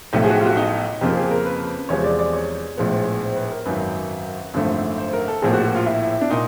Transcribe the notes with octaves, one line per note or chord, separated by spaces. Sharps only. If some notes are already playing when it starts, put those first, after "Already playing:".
B1 A2 F3 A3 G4
G#4
F#4
G4
F4
F#4
D#4
F2 C#3 F3 A#3 G4
G#4
A#4
B4
E2 C3 F3 G#3 B3 C#5
D5
D5
C#5
A#1 A2 F3 G#3 B3
C5
B4
A#4
G#1 F#2 D#3 F#3 B4
G#1 F#2 D3 F3 A3
C5
A#4
A4
A#1 A2 F3 A#3 G#4
F#4
F#4
F4
E4
D4
A#2 D#4